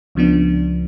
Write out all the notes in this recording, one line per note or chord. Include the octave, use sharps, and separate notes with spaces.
C#2 C#3 F3 B3 D4